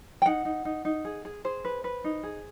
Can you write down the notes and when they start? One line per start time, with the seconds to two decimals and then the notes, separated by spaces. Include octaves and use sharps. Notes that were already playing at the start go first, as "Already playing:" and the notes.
0.22 G5
0.26 D#4 F#5
0.45 D#4
0.65 D#4
0.85 D#4
1.05 G#4
1.25 G#4
1.45 G#4 C5
1.65 B4
1.84 B4
2.04 D#4
2.23 G#4